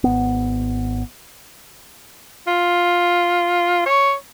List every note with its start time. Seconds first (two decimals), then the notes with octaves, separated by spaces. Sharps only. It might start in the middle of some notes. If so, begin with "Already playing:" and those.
0.04 G#1 B3
2.47 F4
3.86 C#5